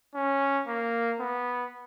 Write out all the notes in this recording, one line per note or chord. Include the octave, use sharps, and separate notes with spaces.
C#4
A#3
B3